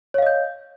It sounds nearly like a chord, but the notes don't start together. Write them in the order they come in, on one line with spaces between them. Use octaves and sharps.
C#5 F5 D#5 G6